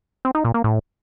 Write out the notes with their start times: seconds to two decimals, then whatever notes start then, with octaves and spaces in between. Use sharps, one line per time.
0.25 C4
0.35 D#4
0.45 A#2
0.54 A#3
0.64 A2